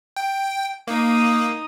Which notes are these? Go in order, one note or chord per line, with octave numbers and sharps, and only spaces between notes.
G5
A#3 D#4 D#6